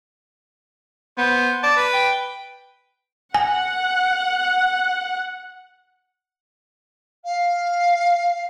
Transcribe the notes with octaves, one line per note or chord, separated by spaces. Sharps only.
B3 C5
D5 A5
B4
G5
F#5 G#5
F5